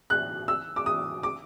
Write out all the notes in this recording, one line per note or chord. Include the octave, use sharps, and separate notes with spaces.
F#6
E6
D6
D#6
D6